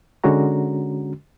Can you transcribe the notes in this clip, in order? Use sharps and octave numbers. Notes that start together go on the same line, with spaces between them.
D3 G#3 C#4 F#4 A#5